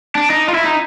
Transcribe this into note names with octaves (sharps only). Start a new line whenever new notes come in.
D4
D#4
F4
E4
D#4